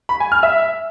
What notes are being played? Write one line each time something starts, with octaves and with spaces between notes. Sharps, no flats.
B5
G#5
F6
E5